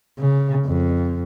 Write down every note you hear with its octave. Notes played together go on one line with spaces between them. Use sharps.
C#3
F2